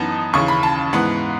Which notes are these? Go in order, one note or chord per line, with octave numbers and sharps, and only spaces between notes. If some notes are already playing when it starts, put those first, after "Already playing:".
Already playing: F#2 E3 B3 D#4 A5
D#2 C#3 E3 C#6
B5
A5
G#2 E3 B3 F#5